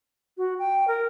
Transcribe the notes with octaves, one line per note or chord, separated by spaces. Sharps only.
F#4
G5
A#4